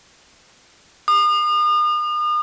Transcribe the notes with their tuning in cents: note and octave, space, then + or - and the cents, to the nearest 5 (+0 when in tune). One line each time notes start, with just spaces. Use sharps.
D#6 -40